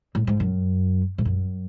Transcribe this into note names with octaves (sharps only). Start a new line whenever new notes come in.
A2
G#2
F#2
G#2
F#2